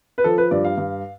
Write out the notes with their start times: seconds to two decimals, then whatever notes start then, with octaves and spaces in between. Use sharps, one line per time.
0.18 B4
0.24 F3 A4
0.38 B4
0.51 G2 D5
0.64 F5
0.78 G2